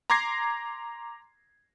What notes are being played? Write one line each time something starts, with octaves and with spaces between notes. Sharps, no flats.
A#5 C6 D6 G#6 A#6 C7